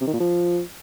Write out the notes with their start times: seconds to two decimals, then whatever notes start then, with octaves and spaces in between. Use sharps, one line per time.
0.01 C3
0.07 D#3
0.14 A#2
0.20 F3